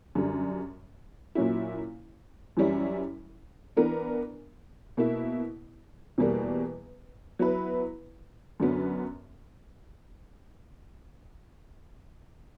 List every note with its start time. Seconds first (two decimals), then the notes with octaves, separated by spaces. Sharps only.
0.15 F#2 D3 G3
1.35 A#2 F#3 C#4 E4
2.57 F#2 E3 G3 C#4 E4
3.77 E3 B3 D4 A#4
4.97 B2 A#3 E4
6.18 E2 B2 G3 A#3
7.39 F#3 B3 E4 B4
8.60 F#2 D3 F#3 B3